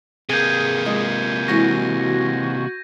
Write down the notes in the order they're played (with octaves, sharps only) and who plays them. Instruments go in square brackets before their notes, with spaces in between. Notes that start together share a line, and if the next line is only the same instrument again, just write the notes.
[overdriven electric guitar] C3 A#3 [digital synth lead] G#4 [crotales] G6 G#6 D#7
[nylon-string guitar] F3 G#3 D#5
[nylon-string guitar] E3 G#3 C4 [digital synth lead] F#4 [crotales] A#6